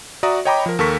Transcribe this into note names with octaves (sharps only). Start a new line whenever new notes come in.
F#4 D5 E5 A#5 D#6
C#5 D#5 G5 A#5 B5 D6
F3 A#4
D#2 A4 A#4 C#6 B6